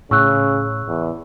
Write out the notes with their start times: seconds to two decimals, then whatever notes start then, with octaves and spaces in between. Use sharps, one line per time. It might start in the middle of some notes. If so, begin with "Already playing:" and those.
0.11 A2 C#3 C#6 E6 F#6
0.87 E2